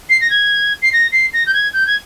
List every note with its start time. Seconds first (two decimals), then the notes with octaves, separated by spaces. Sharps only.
0.10 C7
0.21 A#6
0.30 G#6
0.82 C7
0.93 A#6
1.12 C7
1.33 A#6
1.46 G6
1.54 G#6
1.74 G6
1.87 G#6